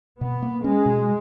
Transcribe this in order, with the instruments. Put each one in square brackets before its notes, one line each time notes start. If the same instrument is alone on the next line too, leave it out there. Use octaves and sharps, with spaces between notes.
[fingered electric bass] B2 [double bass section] B3
[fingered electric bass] A#3
[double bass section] G#3 [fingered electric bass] C#4
[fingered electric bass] B2